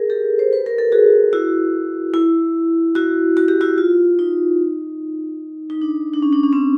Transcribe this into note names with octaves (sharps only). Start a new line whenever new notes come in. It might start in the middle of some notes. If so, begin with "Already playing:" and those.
Already playing: G#4 A#4
G4 A4
C5
B4
A#4
A4
F#4 G#4
E4 F#4
E4
E4 F#4
F#4
G4
E4 F#4
F4
D#4
D#4
D4
D4
C#4
D4
C#4
C4